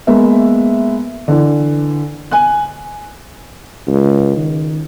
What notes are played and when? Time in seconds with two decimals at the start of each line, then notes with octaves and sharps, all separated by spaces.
0.07 G#3 A#3 B3 E5
1.28 D3 E3
2.31 G#5 F#6
3.87 C#2
4.37 D#3